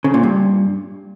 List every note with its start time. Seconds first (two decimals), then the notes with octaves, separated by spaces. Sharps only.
0.04 C#3
0.14 A#2
0.23 G2